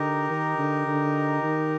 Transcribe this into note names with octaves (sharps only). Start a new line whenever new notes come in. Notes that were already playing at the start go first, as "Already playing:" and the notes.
Already playing: D3 D#4 G4 A#4 D#5
D#3
D3
D3
D#3